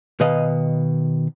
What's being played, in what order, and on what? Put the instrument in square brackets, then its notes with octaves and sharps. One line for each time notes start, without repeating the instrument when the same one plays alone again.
[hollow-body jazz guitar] B2 D#3 B4 D#5 F5